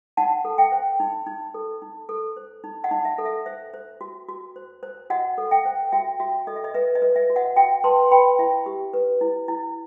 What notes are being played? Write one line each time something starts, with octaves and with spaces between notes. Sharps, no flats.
D#4 F#5 A5
A4
E5 G5
C5
D#4
D#4
A4
D#4
A4
C5
D#4
D#5 F#5
D#4
E5
A4
E5
C5 E5
C5
F#4
F#4
C5
C5
F#4 D#5 F#5
A4
E5 G5
C5
F#4 E5 G5
F#4 E5
A4 D#5
E5
D#5
B4 E5
D#5
B4
E5
F#4
D#5 F#5
F#4 E5 G5
B4 A5 C6
C6
B4 G5 B5
E4 E5
G4
B4
E4
E4